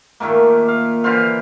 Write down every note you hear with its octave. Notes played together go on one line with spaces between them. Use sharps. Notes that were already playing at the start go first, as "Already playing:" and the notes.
A#2 D#3 A3 A#3
F5
D3 E3 C5 F5